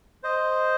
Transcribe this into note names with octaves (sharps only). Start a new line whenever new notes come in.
C5 D#5